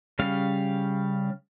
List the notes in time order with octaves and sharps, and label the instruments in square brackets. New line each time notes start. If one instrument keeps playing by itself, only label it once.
[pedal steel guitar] C#3 G3 C#4 F5